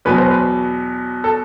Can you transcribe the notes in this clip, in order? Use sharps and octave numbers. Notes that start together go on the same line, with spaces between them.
E2 B2 F#3 B4
C5
B4
A4